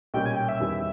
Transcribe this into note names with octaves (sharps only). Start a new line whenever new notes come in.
B1 A#2 G3 C#4 G5
G#5
G5
E5
E2 D#3 G3 C#4